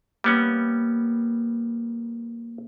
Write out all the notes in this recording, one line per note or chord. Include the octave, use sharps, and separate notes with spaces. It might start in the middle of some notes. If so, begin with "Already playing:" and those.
G3 A#3 B3 C#4